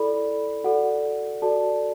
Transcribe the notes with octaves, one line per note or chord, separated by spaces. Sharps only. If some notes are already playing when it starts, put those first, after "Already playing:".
Already playing: E4 A4 D5 B5
F#4 A4 D5 F#5
F#4 A4 D5 A5